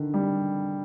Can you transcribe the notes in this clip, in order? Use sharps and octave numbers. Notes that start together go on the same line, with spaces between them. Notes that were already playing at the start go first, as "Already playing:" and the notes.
Already playing: D3 D#3
G3